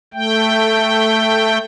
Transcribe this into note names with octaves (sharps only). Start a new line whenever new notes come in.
A3 G5